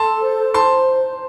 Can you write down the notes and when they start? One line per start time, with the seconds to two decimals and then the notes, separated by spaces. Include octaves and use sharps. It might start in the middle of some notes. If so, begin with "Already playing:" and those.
Already playing: A4 A5 C6
0.22 C5
0.54 C5 A5 C6